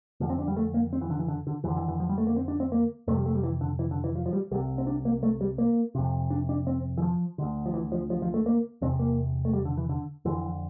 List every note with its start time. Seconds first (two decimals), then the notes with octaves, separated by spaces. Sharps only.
0.20 F2 D3 F3
0.30 C4
0.39 D4
0.48 G3
0.57 A3
0.74 A#3
0.93 C4
1.02 E3
1.10 D3
1.19 E3
1.28 D3
1.47 D3
1.64 F2 D3 E3
1.76 E3
1.88 E3
2.00 F3
2.09 G3
2.18 A3
2.27 A#3
2.36 C4
2.48 D4
2.60 C4
2.72 A#3
3.07 F2 C3 A3
3.16 G3
3.26 A3
3.35 G3
3.43 E3
3.61 D3
3.79 E3
3.91 D3
4.04 E3
4.16 F3
4.26 F3
4.33 G3
4.51 C2 G3
4.55 C3
4.78 C4
4.87 D4
5.05 A#3
5.23 A3
5.41 G3
5.58 A#3
5.95 F2 C3
6.30 D4
6.49 D4
6.67 C4
6.98 E3
7.02 F3
7.38 D2 D3
7.66 F3
7.74 E3
7.92 F3
8.10 F3
8.22 F3
8.34 A3
8.46 A#3
8.81 E2 C3 C4
8.99 A#3
9.45 A3
9.53 G3
9.65 D3
9.77 E3
9.89 D3
10.25 F2 D3 E3